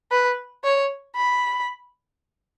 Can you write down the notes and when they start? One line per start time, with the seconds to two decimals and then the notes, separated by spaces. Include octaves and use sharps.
0.12 B4
0.64 C#5
1.16 B5